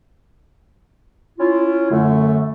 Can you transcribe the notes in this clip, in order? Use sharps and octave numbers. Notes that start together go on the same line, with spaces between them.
C#4 E4 F4
F#2 D3 A3